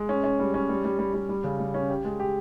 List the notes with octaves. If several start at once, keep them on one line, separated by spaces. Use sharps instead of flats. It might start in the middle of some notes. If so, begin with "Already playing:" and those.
Already playing: G#3
C#4
C#4
G3
C#4
G3
G3
G3
G3
G3
C#3
G3
C#4
G4
G#3
G4